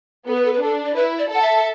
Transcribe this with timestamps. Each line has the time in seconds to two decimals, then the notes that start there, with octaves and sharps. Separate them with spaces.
0.27 B3 A4
0.35 B4
0.45 A4
0.53 B4
0.62 D4 A4
0.86 D5
0.96 E4 B4
1.19 D5
1.30 A4 F#5
1.43 E5